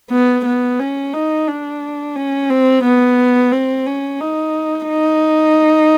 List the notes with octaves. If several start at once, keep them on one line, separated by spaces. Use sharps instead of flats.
B3
B3
C#4
D#4
D4
C#4
C4
B3
C4
C#4
D#4
D#4